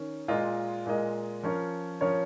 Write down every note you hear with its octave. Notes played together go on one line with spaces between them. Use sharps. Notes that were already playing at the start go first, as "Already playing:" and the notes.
Already playing: D#3 C#4
A#2 G#3 F4 A#4 D#5
A#2 G#3 F4 A#4 D#5
F3 C#4 A#4 C#5
F3 C#4 A#4 C#5